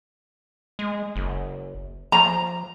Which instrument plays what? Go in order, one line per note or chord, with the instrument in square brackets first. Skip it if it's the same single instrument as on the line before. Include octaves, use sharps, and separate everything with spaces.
[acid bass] G#3
F#1
[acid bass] F3 [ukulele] A#5